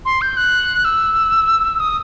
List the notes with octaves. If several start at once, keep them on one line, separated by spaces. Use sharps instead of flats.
C6
G6
F#6
E6
D#6